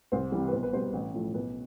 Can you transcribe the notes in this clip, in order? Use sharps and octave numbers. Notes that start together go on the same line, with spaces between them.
C2 C5
C3 E3 G3
B4
B1 C5
B4
B2 G3 C5
B4
A1
A2 F3 A3
B1 B4